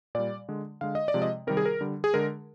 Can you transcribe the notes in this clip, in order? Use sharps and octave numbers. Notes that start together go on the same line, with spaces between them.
A#2 G3 D5
D3 G#3
D3 G#3 F5
D#5
D5
C3 F3 G#3
D#5
C3 D#3 G3 A#4
G#4
A#4
D3 G3
G#4
D3 G#3 A#4